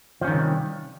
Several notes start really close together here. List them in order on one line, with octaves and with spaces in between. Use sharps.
F3 C#4 D#3 G3 C3